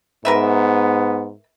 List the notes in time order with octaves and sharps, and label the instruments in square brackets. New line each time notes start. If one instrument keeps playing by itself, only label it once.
[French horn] G#2 [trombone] B3 [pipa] A#4 B4 E5